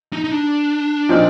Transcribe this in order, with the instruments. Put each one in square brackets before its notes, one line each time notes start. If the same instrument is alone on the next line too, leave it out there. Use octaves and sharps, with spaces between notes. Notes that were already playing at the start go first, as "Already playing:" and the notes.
[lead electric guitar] D#4
D#4
D4
[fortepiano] A#2 F3 C4 D#4